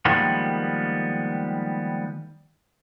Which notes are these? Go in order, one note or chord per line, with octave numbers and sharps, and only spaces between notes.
D#3 F3 G3 G#3 A#3 B3